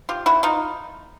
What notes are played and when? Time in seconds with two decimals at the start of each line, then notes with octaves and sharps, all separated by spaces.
0.09 F4 G4
0.26 E4 F#4
0.43 D#4 F4